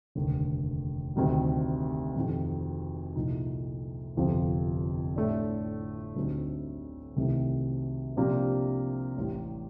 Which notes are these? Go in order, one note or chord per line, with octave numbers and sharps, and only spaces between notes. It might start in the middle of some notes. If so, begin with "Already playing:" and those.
F1 D#2 D3
D2 C3 D#3 G3
F2 C3 D#3
C2 A#2 F3 A#3 D#4
G1 F2 C3 F3
A2 A3 D4
D2 D3 G3 C4 D#4
C2 C3 D#3 A3
C3 F3 A#3 D4 G4
A1 A2 G3